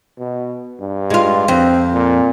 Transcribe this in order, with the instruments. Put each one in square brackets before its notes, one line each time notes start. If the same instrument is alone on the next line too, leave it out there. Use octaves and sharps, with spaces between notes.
[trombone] B2
G2
[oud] G#3 F4
[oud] F2 [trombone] C4
[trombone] A#2